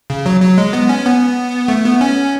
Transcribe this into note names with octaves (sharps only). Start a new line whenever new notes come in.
C#3
F#3
F#3
G#3
B3
C#4
B3
A3
B3
C#4